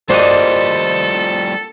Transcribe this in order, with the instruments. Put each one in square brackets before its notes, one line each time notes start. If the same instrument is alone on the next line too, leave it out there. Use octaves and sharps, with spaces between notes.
[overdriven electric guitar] F3 G3 [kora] A#3 D4 F#4 [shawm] A4 [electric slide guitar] C5 D#5